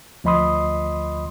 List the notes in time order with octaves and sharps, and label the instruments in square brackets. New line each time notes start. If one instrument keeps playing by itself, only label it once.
[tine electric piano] D2 F3 D#5 B5 C6 D#6